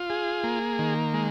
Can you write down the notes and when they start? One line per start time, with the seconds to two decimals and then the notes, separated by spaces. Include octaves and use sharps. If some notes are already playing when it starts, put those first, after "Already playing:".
Already playing: F4
0.10 G#4
0.44 A#3
0.79 D#3
1.14 G#3